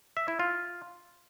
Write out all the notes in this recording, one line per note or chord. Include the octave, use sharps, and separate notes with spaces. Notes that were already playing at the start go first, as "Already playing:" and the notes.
E5
E4
F4